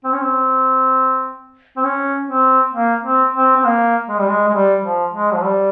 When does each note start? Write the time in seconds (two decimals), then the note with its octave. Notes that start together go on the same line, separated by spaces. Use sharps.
0.04 C4
0.13 C#4
0.22 C4
1.77 C4
1.84 C#4
2.29 C4
2.74 A#3
3.04 C4
3.34 C4
3.57 C4
3.64 A#3
4.09 G#3
4.19 G3
4.29 G#3
4.49 G#3
4.54 G3
4.84 F3
5.14 G#3
5.34 F3
5.44 G3